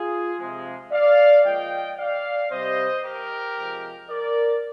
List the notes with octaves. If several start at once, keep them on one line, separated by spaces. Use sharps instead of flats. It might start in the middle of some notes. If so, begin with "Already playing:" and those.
Already playing: F4 G#4
C3 F3 G#3
D5 F5
A#2 F3 G#3 D#5 G5
D5 F5
C3 G3 C5 D#5
G4 A#4
C3 F3 G#3
A#4 D5